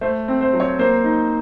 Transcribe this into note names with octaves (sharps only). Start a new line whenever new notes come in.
A3 C5
C4
C5
F#3
C#5
A#3 C5
D#4